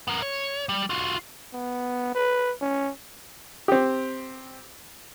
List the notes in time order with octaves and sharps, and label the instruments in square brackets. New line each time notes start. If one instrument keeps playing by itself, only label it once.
[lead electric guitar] B3 A#4
C#5
G3
F4 F#4
[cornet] B3
B4
C#4
[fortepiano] C4 G4